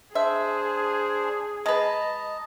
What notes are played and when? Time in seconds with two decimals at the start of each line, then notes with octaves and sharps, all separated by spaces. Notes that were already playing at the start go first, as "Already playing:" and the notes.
0.15 D4 G#4 C5 E5
1.66 G#3 B4 D#5 A5 A#5